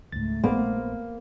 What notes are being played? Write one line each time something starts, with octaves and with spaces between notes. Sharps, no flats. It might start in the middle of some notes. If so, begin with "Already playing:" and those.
C#2 G#2 A3 A6
A#1 A#3 B3 B4 C5